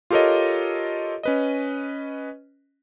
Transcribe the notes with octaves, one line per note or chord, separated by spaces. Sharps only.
F4 G4 A4 A#4 C#5 D#5
C#4 B4 D#5